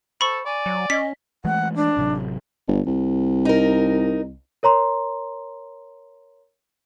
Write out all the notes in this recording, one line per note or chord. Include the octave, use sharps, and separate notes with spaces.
A4 C5 B5 C#6
D5 G#5
F#3
C#4 D#5 B6
E3 G#3 A3 F#5
D4
A1 C3 F#3
G1
C2
D#4 A#4
A#4 C#5 A#5 C6